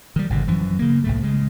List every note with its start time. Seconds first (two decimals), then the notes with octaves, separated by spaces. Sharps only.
0.16 D#3 G3
0.30 G#1 B2 D3
0.47 F#2 E3 F3
0.79 C#3 A#3
1.04 C2 A2 A3
1.23 C#3 G#3